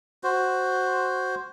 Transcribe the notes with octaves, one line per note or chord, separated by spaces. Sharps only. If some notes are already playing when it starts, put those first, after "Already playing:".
F#4 C5